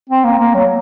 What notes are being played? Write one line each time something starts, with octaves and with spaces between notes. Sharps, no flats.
C4
A#3
A#3
F#3